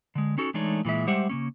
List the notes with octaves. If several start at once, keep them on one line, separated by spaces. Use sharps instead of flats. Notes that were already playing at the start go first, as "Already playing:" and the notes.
D3 G#3
C#4 D#4 F#4 A4
E3 G#3 A3 D4 D#4 C#5
A#2 E3 G#3 E5
G3 G#3 G4 C5 E5 F#5
C#3 A#3 C#4